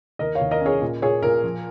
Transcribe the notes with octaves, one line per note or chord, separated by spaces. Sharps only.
D#2 A#4 D#5
C#5 F5
D#2
A#4 D#5
C#4
G#4 C#5
A#2
A#2 G#4 C#5
A#2 A#4
F3